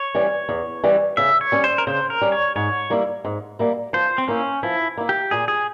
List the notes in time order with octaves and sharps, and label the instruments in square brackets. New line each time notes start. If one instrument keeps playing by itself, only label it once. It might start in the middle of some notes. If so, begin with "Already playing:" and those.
Already playing: [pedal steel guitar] C#5
[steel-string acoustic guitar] E3 G3 C#4
E2
E3 G3 C#4
[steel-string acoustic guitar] C#3 [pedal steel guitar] E5
[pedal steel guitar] C#5
[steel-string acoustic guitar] G3 C#4
[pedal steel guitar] C5
A#4
[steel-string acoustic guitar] C#3 [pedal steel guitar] C5
[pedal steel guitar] A#4
[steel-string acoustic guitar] G3 C#4
[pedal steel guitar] C#5
[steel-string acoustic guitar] G#2 [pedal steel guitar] C#5
[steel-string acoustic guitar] G3 A#3 E4
G#2
G3 A#3 E4
[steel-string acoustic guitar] F3 [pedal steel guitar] C5
[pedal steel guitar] C4
[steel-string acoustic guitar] A#3 E4 [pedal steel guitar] C#4
[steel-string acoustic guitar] F3 [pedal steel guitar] E4
[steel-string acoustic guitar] A#3 E4
[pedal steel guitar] G4
[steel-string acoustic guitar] A#2 [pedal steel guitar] G#4
[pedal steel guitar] G#4